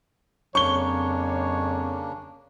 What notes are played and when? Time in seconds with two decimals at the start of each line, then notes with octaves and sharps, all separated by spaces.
0.55 F2 C#3 F#3 A#3 D4 C#5 C#6 G7